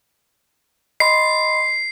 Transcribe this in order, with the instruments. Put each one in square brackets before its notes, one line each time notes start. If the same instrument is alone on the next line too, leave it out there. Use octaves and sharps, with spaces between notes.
[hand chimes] D#5 B5 C6 [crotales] C7